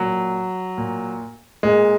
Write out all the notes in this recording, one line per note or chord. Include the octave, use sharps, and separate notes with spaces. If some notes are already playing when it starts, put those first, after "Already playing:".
Already playing: A#2 F#3
A#2
A#2 G#3